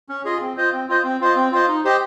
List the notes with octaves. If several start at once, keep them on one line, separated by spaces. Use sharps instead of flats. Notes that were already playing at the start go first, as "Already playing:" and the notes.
C#4
F4 G#4 D#5
C4
F4 C5 D#5
C4
F4 C5 D#5
C4
F4 C5 D#5
C4
F4 C5 D#5
D#4
G4 C5 D#5